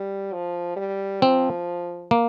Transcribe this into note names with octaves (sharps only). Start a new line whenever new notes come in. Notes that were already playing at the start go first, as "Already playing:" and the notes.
Already playing: G3
F3
G3
F3 C4
A#3